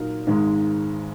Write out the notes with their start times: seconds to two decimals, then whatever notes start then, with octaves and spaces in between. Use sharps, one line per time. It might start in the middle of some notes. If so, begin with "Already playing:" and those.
Already playing: A#2 F#3 D#4 A#4
0.27 G#1 G#2 G#3 D#4